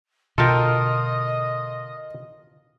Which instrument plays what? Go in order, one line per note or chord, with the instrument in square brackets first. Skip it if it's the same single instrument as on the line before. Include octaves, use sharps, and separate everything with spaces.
[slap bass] B2 D3 [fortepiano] F4 [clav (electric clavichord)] A4 A#4 G5 [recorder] D#5